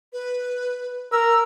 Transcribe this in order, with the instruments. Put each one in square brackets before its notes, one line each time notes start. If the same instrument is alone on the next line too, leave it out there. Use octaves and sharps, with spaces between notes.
[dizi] B4
[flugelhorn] A#4 [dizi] E6